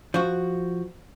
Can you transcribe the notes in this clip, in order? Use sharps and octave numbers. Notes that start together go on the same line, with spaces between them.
F3 F#4